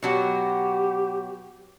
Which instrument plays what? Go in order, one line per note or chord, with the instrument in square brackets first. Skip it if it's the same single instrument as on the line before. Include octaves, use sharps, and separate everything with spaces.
[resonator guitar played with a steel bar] B2 F#3 F#4 [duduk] G4